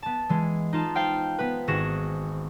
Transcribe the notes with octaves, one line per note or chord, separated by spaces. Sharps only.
B3 A5
E3 G#3
D#4 F4 A5
C5 F5 G5 F6
B3 B4
G#1 F#4 G#4 A#6 E7